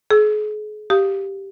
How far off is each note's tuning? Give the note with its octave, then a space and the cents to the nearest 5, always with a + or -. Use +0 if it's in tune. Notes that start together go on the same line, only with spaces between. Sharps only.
G#4 +40 E6 +10
G4 -5 F5 +0 D#6 +0